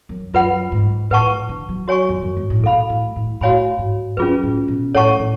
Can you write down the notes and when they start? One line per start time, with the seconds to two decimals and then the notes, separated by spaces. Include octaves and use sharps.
0.09 F#2
0.34 F#2 F4 B4 F#5 B5
0.72 G#2
1.10 A2 B4 F#5 A5 C#6
1.49 D3
1.69 F#3
1.88 F#4 C#5 G#5 C#6
2.09 F2
2.22 F#2
2.37 G#2
2.50 A2
2.64 B2 A4 F5 B5
2.90 A2
3.16 A2
3.41 A2 F#4 C#5 F5 G#5 B5
3.79 G#2
4.17 F#2 C#4 F4 G#4 B4
4.43 A2
4.68 B2
4.95 A2 A4 C#5 F#5 A5 C#6
5.19 A2